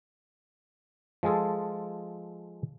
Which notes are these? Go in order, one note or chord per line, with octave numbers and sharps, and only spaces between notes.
F3 G#3 F4 G#4 A4